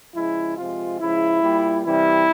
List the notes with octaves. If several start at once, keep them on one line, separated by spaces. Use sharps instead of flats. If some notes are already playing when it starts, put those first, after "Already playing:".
C#3 F3 G#3 E4
C3 F3 G#3 F4
C#3 F3 G#3 E4
A#2 G3
C3 E3 G3 E4